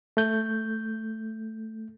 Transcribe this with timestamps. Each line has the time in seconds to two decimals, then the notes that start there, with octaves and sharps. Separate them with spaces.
0.17 A3 G6